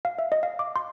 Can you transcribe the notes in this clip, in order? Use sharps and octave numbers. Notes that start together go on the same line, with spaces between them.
F5
E5
D#5
F5
D6
C6